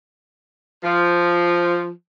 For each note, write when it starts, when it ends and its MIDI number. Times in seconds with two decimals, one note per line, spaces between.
0.83 1.89 53